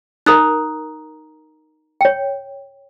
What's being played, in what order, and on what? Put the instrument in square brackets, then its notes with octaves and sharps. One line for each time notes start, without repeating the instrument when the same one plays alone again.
[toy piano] D#4 A#4 [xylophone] A#5 D#6 F#6
[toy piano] C#5 G5